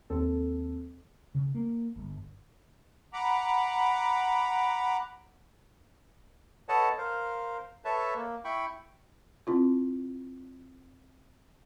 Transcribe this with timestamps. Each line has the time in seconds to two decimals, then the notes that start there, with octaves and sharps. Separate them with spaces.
0.10 D#2 C4 A4
1.35 C#3
1.55 A#3
1.96 G1
3.13 F#5 A#5 B5 D6
6.69 A4 B4 C#5 D#5 F#5 A5
6.98 A#4 C5 F5
7.85 A4 B4 C#5 E5 A5
8.15 A#3
8.44 E4 G5 B5 C#6
9.47 C4 E4 F4